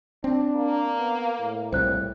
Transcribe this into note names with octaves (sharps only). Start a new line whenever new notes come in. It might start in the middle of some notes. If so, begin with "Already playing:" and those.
C4 D4
A#3
B3
A2
C2 A#2 G3 C5 F#6